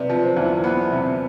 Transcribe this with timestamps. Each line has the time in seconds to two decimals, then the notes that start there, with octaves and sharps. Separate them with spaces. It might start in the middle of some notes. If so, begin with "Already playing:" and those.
Already playing: C3 B4 D5
0.10 F3
0.23 C5
0.37 E2
0.64 B3
0.92 C3